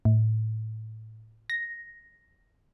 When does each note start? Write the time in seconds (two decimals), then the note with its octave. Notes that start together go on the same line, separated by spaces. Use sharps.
0.05 A2
1.50 A#6